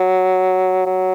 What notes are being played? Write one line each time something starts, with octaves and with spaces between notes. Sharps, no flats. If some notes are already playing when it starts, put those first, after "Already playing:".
Already playing: F#3
F#3